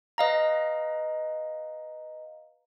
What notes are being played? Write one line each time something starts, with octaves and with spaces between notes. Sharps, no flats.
B4 D#5 F5 A#5